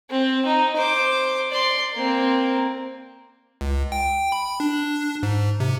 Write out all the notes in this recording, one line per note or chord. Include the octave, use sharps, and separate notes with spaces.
C4
D#4
C5 D6
D5 C6
A#3 C4
C#2
G5
B5
D4
G#2
C3